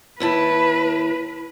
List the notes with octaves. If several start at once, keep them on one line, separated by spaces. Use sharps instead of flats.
D#2 E4 B4 A5